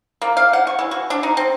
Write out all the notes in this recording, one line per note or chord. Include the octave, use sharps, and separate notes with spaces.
A#3
F5
F#5
C#6
E3
F#4
D4
D#4
C4